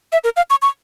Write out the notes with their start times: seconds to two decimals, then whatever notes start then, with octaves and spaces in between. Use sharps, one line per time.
0.12 E5
0.24 A#4
0.36 F5
0.50 C#6
0.62 C#6